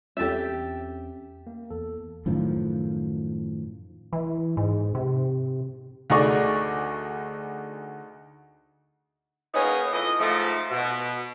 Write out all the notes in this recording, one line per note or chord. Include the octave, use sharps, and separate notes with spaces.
E2 C4 C#4 G4 A4 E5
A#3
E2 A4
F#2 A2 D#3 F3
E3
G#2
C3
D2 A3 D#4 G#4 D5 C#6
A#3 B3 C#4 D#4 G#4
F2 E3 D#5
G#2 F3 A3
B2